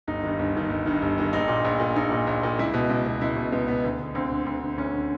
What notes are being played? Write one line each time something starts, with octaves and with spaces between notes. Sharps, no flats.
G1 D#4
G2 D#3
G1
G2 D#3
G1
G2 D#3
G1
G2 D#3
A#1 D#4
A#2
A#1
A#2
A#1 D#4
A#2
A#1
A#2
C#2 E4
B2
C#2
B2
C#2 E4
B2
C#2 B3
B2 B3
D2
D3
D2 C4
D3
D2
D3
D2 C#4
D3